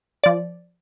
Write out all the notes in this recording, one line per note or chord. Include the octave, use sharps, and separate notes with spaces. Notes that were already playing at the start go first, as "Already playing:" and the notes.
F3 D5